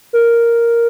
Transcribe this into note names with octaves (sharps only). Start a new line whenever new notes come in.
A#4